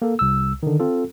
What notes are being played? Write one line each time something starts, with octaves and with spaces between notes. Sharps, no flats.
A#3 A4
C2 E6
D3 D#3
C4 F4 A4